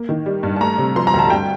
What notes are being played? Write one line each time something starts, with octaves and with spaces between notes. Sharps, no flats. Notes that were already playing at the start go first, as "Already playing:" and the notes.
Already playing: A#3
D#3
G3
G2
A5
A3 A#5
C3
F3 C6
A#5
D2
A5
G2 G5